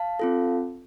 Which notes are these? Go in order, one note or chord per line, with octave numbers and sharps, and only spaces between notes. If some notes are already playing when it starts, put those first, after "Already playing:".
Already playing: F5 A5
C4 F4 A4